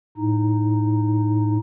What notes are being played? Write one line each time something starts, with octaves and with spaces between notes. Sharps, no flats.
A2 D#4